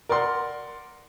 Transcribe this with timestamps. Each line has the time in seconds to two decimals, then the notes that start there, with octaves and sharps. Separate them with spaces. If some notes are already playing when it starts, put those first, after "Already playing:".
0.09 A#4 D5 F#5 C6